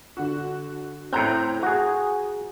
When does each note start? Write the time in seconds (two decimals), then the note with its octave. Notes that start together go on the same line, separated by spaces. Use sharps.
0.17 D3 F#4
1.13 A2 C4 A#5 F#6 G6
1.63 F#4 G#4